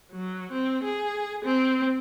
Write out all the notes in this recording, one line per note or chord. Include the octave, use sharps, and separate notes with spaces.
F#3
C4
G#4
C4